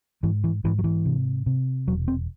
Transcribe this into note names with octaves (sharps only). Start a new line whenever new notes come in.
G#2 E3
E3
G#2 E3
F#3
E3
C3
C3
E1 F#3
C4